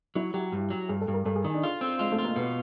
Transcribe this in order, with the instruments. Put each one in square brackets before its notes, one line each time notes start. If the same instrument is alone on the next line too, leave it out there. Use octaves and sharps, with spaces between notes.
[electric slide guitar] F#3 [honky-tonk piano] E4
[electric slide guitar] F#3 [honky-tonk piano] G4
[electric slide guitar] G2
F#3
[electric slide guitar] G2 [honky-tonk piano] G#4
[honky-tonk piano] A4
[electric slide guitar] G2
[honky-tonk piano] A#4
[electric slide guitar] G2 [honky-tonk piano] A4
[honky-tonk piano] G#4
[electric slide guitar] D#3 [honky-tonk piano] D#4
[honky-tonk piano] D4
[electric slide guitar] F4
C4
[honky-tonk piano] G#3 [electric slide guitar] F4
[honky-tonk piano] A3
[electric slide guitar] F4
[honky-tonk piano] A#3
[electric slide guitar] B2 [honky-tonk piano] B3